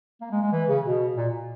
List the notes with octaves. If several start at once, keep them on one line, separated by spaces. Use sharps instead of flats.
A#3
G#3
G#3
E3
C#3
B2
A#2